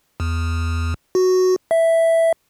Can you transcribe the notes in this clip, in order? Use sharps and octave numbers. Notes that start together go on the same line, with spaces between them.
E2
F#4
E5